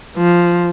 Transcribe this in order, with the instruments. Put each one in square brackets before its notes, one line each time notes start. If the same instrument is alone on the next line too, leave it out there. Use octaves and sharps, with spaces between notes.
[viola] F3